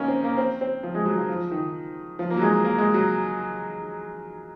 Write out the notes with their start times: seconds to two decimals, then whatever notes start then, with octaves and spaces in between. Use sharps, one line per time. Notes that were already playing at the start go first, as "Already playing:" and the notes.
Already playing: A#3 C#4 D#4
0.08 C4
0.24 A#3
0.38 C4
0.61 C4
0.83 F3
0.95 G#3
1.06 F#3
1.17 F3
1.29 F3
1.51 D#3
2.19 F3
2.30 A#3
2.37 F#3
2.42 G#3
2.64 A#3
2.78 G#3
2.94 F#3